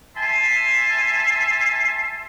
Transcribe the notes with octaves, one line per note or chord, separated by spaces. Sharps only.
E5 G#5 A5 C6